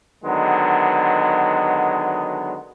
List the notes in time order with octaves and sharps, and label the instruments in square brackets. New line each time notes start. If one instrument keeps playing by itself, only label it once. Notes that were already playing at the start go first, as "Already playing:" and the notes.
[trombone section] D3 D#3 F#3 G#3 B3